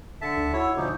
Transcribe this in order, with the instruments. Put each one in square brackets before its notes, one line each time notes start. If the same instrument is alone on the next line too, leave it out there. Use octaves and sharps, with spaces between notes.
[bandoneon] D3 E5 A5 [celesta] B6 C#7
[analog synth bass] D2
[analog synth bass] E4 [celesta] F#4 F#5 E6 [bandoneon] C#5
[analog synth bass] D2 [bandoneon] A#2 F3 D#4 [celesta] D6 D#6 G6